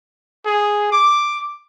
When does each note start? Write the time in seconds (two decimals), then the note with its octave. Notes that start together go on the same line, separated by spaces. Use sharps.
0.46 G#4
0.92 D6